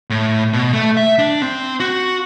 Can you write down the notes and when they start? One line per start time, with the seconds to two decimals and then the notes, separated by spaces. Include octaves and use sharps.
0.10 A2
0.53 B2
0.73 A3
0.97 E5
1.19 D4
1.42 C4
1.80 F#4